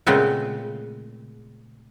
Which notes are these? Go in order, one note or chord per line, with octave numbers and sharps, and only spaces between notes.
A#2 C#3 G#3 A3 B3 C4